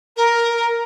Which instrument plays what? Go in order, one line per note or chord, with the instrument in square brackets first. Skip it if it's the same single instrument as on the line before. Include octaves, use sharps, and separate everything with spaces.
[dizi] A#4